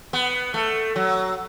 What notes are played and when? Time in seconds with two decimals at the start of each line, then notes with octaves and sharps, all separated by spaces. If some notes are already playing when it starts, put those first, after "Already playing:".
0.13 B3
0.54 A3
0.96 F#3